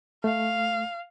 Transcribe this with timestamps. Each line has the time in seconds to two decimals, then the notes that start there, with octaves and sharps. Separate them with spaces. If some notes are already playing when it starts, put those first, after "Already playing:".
0.24 A3 F5